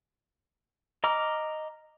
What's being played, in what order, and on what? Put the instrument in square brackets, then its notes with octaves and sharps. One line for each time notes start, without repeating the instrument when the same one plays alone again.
[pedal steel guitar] D#5 A#5 D6 F6